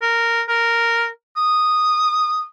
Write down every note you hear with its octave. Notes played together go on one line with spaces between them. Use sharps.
A#4
A#4
D#6